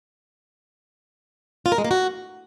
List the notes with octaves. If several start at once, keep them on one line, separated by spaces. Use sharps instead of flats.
F4
A#4
G#3
A#3
F#4